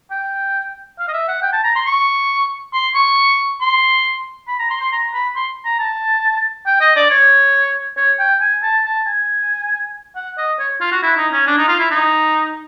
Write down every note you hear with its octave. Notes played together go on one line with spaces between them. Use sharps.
G5
F5
D#5
E5
F#5
G5
A5
A#5
C6
C#6
C6
C#6
C6
B5
A#5
C6
C6
A#5
B5
C6
A#5
A5
G5
D#5
D5
C#5
C#5
G5
G#5
A5
A5
G#5
F#5
D#5
C#5
F4
F#4
E4
D#4
C#4
D4
D#4
F4
E4
D#4